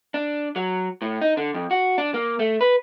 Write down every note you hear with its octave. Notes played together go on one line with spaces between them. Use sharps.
D4
F#3
A2
D#4
D3
F2
F#4
D4
A#3
A3
B4